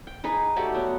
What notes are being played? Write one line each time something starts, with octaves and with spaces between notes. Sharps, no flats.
G5
D#4 G#4 B4
A3 F#4 G4 D5
F#3 B3